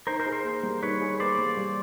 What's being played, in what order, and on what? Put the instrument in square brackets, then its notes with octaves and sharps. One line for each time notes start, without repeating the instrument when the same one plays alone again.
[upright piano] D#4 [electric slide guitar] A#4 C5
[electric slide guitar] A#4 C5
[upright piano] G#4
[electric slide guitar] A#4 C5
[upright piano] A#3
G3
[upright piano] D#4 [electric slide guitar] B4 C#5
[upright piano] G#4
[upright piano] A#3 [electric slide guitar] C5 D5
[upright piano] G3
G3